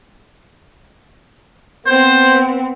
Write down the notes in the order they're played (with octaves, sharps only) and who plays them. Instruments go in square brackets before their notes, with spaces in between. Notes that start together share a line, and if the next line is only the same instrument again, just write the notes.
[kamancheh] B3 C4 [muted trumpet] C5